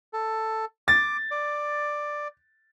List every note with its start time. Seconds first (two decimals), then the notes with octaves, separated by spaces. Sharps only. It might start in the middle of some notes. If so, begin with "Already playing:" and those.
0.13 A4
0.88 D6 A6
1.31 D5